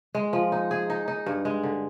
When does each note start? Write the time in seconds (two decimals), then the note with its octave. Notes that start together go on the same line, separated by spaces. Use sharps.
0.15 G#3
0.33 F3
0.52 D#4
0.71 G#4
0.90 D#4
1.08 D#4
1.26 G2
1.45 G#3
1.63 D3